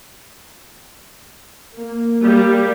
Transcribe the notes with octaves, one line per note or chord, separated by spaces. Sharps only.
A#3
G3 A#3